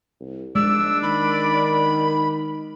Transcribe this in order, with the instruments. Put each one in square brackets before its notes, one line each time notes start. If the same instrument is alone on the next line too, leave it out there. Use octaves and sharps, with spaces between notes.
[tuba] C2
[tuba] A#1 [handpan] G#3 [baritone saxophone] D4 [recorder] E6
[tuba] D#3 [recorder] B5